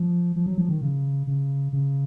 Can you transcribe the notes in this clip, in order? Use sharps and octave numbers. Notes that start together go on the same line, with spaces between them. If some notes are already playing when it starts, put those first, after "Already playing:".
Already playing: F3
F3
F#3
F3
D#3
C#3
C#3
C#3